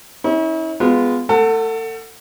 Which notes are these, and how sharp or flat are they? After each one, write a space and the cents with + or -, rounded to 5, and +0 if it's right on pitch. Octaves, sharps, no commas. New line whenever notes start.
C#4 +0 E4 -40
G#3 +0 B3 +10 F4 -5
A3 +0 A4 +35 F#5 +0